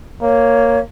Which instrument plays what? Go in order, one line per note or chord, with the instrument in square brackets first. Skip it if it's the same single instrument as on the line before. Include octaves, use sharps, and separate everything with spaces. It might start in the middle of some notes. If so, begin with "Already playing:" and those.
[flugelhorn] A#3 [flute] C#5